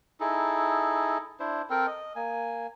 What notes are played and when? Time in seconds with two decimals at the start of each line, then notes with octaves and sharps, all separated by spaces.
0.20 D#4 E4 G#4 A4
1.40 D4 E4 C5
1.70 C4 A4 A#4 G5
1.87 D#5
2.16 A#3 G#5